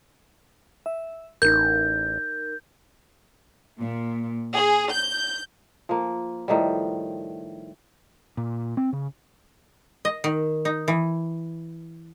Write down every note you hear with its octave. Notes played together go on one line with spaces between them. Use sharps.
E5
A1 D#4 A#4 G6
A#2
G#4
G6
F3 A#3
A2 D#3 F3 G3
A#2
C4
C#3
D#5
D#3
D#4
E3